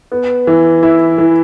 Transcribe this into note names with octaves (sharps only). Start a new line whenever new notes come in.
B3
E3
E4
E3